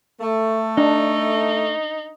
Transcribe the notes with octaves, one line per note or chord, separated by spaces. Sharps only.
A3
D4 D#4